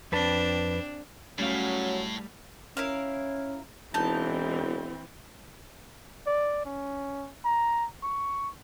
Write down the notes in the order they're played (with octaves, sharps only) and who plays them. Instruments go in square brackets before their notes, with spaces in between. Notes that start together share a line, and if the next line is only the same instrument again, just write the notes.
[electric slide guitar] F2 B4 A5 [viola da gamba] C4 D4
[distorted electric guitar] A2 [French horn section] F#3 C#4 [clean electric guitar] G3 A3 F5
[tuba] C#4 [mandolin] E4 A#4 F5
[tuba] E1 [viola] E3 C4 [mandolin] D#4 A5
[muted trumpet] D5
C#4
A#5
C#6